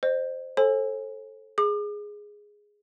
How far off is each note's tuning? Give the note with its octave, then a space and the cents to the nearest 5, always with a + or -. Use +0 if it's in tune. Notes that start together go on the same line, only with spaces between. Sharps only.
C5 +0 D#5 -35
A4 +0 C5 +40 G#5 +0
G#4 +0 D6 +40